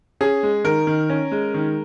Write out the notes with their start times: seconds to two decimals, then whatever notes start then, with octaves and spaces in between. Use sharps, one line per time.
0.21 C#4 G#4
0.43 G#3
0.64 D#3 A#4
0.87 D#3
1.10 C#4
1.32 G#3
1.54 D#3